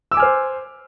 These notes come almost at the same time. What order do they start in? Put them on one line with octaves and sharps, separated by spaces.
E6 D6 G#5 F6 C5